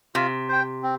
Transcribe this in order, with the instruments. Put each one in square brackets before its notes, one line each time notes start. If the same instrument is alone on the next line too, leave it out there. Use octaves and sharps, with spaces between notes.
[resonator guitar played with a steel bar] C3 [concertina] F4
[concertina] C5 G5
C4